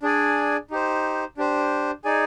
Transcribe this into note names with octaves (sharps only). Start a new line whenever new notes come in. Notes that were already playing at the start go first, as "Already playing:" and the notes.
D4 G#4 D5 G#5
D#4 G4 C5
D4 G4 C5
D#4 G#4 D5 G#5